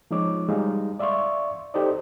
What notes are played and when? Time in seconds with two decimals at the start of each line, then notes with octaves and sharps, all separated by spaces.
0.11 F3 G#3 D#4 C#5 D6
0.49 G3 G#3 D#4 F5
0.99 D5 E5 F5 C6 C#6
1.74 D#4 G4 A4 C5 D5 D#5